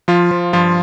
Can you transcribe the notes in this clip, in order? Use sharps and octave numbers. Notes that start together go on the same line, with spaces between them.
F3 F4
F3
G2 F3 F4